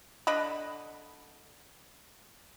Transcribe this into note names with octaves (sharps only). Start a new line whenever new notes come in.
D3 D4 D#5 B5